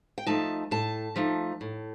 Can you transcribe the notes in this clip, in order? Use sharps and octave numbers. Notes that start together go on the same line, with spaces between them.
G5
F3 A3 D#4 A5
A2 A5
F3 A3 D#4
A2